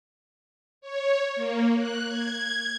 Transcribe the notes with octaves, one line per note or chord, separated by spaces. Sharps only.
C#5
A#3
F#6
G#6